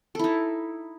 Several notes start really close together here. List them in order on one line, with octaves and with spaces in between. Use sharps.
A4 E4 D#4